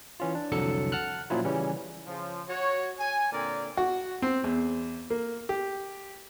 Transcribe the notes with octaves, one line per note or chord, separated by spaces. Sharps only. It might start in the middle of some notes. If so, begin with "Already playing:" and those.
E3 C#4 F4
D4
C2 F2 D3 F#3 A4 C#7
F#5 A5 F6 F#6
A#2 F3 F#3 C#4 E4 F4
C#3 E3 G3 C#4
C#3 F3
F#4 C#5
G#5
A#2 D3 C4 A#4 D5
F#4
C4
E2
A#3
G4